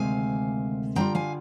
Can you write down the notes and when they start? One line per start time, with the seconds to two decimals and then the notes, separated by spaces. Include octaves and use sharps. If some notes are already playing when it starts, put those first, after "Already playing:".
Already playing: D2 C3 D#3 G#3 F5 G#5
0.95 D3 G3 C4 G5 A#5
1.01 F4
1.15 F5 G#5